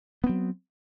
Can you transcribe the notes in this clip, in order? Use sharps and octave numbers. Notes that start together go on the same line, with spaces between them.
F#3 B3 C4